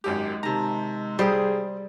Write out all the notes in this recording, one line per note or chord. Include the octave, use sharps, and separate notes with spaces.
G#1 F#2 G#3 G4
C3 D#3 A5 A#5
G3 G#4 C5 G5 D#6